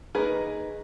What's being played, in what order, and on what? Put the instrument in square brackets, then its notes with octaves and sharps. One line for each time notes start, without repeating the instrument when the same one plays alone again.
[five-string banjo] D#3 A#3 D#4 G#4 B4